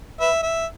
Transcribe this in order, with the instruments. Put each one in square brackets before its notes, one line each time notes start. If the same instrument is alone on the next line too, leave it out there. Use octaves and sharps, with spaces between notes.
[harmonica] B4 E5
E5